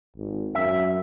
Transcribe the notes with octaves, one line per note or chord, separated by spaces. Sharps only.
G#1
F#2 E5